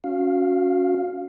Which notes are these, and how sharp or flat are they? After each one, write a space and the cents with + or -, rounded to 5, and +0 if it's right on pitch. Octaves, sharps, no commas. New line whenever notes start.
C#4 +10 F#4 -20 F5 +0